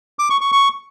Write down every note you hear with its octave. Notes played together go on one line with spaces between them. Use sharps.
D6
C#6
C#6
C#6